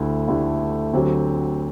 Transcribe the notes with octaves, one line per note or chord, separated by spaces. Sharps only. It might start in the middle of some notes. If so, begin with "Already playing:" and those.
Already playing: D2 D3 A3 E4 G4
D2 D3 A3 E4 G4
D2 D3 F#3 C4 G4